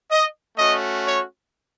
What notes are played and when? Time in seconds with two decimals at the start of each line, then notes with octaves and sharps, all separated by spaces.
0.10 D#5
0.57 A3 C#4 F#4 D#5
1.05 C#5